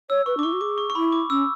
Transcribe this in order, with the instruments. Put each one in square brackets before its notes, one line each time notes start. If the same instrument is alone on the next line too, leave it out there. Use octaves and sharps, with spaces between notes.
[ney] C#5 [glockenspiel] E6
[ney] B4 [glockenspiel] C#6
[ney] D4 [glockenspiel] D6
[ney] E4 [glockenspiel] C#6
[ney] F#4
[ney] G#4 [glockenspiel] D6
[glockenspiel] C#6
C#6
[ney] E4 [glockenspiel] B5
[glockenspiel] D6
[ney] C#4 [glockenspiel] E6